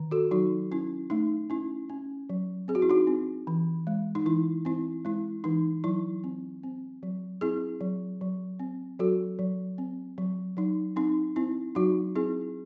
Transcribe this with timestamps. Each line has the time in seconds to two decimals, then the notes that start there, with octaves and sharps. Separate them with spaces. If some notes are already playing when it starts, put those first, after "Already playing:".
Already playing: D#3
0.11 F#4 A4
0.31 F#3 D#4 F#4
0.71 C#4 E4
1.10 A3 D#4
1.50 C#4 E4
1.90 C#4
2.30 F#3
2.68 C4 G#4
2.75 F#4
2.82 E4
2.89 D#4 F#4
3.07 C4
3.47 E3
3.87 G#3
4.15 D#4
4.26 E3 E4
4.65 C4 E4
5.05 G#3 E4
5.44 E3 D#4
5.84 F#3 E4
6.24 C4
6.63 C4
7.03 F#3
7.41 C4 E4 G#4
7.81 F#3
8.21 F#3
8.59 C4
8.99 F#3 F#4 A4
9.39 F#3
9.78 C4
10.18 F#3
10.57 F#3 D#4
10.96 C4 D#4
11.36 C4 E4
11.75 F#3 D#4 F#4
12.15 C4 E4 G#4